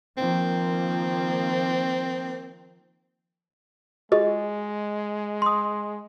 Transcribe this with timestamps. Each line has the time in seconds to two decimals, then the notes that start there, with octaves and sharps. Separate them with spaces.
0.17 D#3 F3 A#3 C4
4.12 G#3 F4 F#4 G#4 D#5
5.42 C6 D#6